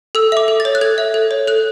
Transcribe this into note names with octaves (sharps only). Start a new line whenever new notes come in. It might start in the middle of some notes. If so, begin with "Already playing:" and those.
A4 E6
E5 D6
A4
A6
C#5
F#6
A4 G#6
E5
A4
C#5
A4 F#6